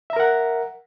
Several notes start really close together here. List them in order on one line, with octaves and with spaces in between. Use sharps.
E5 A#5 A#4 F#5